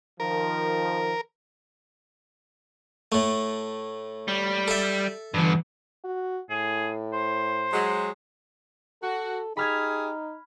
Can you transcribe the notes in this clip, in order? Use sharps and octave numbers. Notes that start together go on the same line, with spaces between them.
D#3 F3 A#4
A2 A3
G3
A4 E5
G2 D3 E3
F#4
A2 G#4
C5
F#3 G#3
F#4 A4
D#4 G4 G#4 B5 F6 G#6